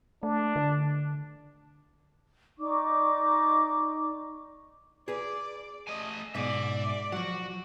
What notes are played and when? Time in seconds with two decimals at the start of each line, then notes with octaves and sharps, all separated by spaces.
0.23 A3 D4
0.56 D3
2.58 D#4 D5 C#6 D6
5.08 G#4 B4 D5
5.88 A3 D#5 G#5
6.35 G#2 B2 D5 E5 G#5
7.12 F3 F#3 F#4 F#5